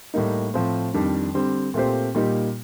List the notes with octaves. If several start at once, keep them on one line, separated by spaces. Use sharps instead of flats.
A2 G3 A#3 D#4
A2 F3 C4
F2 D#3 G3 D4
D3 G3 C4 G4
A#2 A3 C4 G4 C5
A#2 G3 A#3 D#4 G4